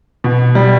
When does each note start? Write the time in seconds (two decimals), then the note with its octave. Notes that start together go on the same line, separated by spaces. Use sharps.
0.24 B2
0.55 G3